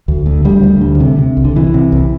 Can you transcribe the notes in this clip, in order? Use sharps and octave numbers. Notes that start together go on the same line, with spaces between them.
D2
D2
D2 G3
D2
D3
C3
C3
C2
D3
C3 E3
C3
C2